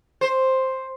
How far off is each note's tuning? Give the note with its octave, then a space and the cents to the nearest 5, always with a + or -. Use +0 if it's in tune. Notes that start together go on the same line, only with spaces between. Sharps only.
C5 +5